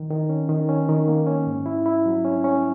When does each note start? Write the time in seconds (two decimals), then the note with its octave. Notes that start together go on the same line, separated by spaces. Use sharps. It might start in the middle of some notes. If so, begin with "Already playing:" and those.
Already playing: D#3
0.10 D#3
0.29 C#4
0.49 D#3
0.69 C#4
0.89 D#3
1.08 A#3
1.27 C#4
1.47 G#2
1.66 E4
1.86 E4
2.06 F#3
2.25 C#4
2.44 C#4